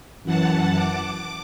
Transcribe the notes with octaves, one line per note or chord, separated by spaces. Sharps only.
F#2 E3 F#5 A5
D6